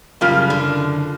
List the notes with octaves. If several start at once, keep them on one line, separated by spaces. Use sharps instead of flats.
F#1 F#2 C#3 G3 F4 F6
D3